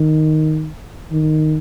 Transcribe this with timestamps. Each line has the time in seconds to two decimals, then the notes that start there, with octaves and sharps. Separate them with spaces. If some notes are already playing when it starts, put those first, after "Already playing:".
Already playing: D#3
1.11 D#3